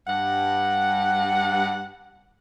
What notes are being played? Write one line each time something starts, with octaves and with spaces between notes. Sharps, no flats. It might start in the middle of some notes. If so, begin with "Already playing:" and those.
G2 F#5